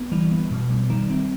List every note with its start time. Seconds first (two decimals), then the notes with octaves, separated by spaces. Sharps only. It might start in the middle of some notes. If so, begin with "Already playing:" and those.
Already playing: B3
0.12 E3 G3
0.31 B3
0.51 B2
0.70 G3
0.90 D#3 G3
1.10 C4